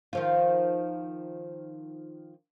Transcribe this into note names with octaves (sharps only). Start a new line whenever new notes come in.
D#3 F3 F4